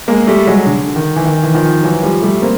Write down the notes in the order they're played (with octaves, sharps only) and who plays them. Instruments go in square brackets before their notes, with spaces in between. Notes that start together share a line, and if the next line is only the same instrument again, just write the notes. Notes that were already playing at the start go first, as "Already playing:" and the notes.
[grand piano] G#3 A#3
G3 A3
F#3 G#3
D3
D#3
E3
D#3
E3
D#3 F3
E3 F#3
F3 G3
G3 A3
A#3 C4